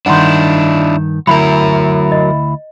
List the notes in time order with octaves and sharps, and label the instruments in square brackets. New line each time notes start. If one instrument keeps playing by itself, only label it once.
[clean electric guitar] G2 D#3 [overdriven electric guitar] D4 E4 [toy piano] F#5 A#5 C6
[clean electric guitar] D2 E4 [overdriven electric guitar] F#3 A#4 [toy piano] B5
[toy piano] D#5